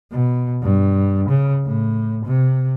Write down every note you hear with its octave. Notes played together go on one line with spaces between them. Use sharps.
B2
G2
C#3
A2
C3